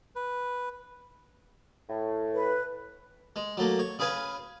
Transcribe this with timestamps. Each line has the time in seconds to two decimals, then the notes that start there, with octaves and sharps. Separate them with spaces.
0.16 B4
1.89 A2
2.35 B4
3.36 G#3
3.57 F#3 A3 A#3
3.79 C#5
3.99 C#3 G#4 B4 F5 G#5